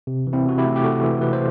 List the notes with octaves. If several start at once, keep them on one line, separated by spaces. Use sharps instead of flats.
C3
E3
C4 E4
C3 F#4
E4 G4
A3
G4
C3 F#4 A4
E3
C3 B4
C5